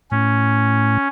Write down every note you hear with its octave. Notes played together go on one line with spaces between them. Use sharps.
A2 C#4